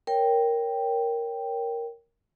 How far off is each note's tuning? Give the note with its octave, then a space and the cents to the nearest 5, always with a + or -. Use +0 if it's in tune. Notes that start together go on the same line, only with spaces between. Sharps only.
A#4 +0 C#5 +0 G5 +0